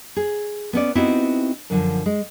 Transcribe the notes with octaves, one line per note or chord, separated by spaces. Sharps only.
G#4
B3 C#4 D5
B3 C4 D#4 E4 F#4 G4
F#2 D3 F3
G#3